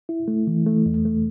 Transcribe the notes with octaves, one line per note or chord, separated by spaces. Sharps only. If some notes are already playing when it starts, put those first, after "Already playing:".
E4
A3
E3
A3
E2
A3